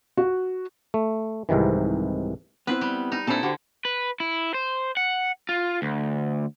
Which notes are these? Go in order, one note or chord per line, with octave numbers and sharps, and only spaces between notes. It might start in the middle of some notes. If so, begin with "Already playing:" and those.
F#4
A3
C2 G#2 C3 D#3 E3
B3 C4 E4 B4
G3
D#4
A#2 C4 D4 E4 A4
D3 F#4 G4 C5
B4
E4
C5
F#5
F4
D2